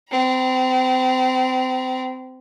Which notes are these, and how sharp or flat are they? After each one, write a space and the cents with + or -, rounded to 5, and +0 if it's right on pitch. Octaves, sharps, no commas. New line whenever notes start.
C4 -30 A#5 +40